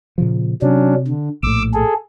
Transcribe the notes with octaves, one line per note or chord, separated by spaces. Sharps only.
A#2 C#3 F3
C3 F#3 C#4 D4
D3
A#1 A2 D6 E6
G#4 A4